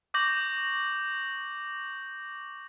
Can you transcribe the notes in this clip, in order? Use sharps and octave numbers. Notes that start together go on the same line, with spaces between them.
C#6 D6 G6 A#6 F#7